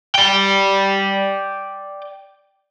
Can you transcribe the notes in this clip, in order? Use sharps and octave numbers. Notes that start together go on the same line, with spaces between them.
D5 G5